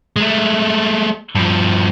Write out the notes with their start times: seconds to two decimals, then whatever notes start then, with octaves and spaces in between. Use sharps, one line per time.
0.16 G#3 A3
1.35 G2 F3